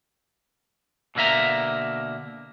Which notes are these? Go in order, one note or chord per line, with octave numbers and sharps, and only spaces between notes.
B2 D3 A#3 E5 A#5